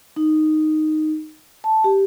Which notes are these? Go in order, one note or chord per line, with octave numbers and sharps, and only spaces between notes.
D#4
A5
G4